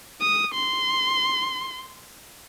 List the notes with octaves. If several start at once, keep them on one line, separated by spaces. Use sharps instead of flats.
D#6
C6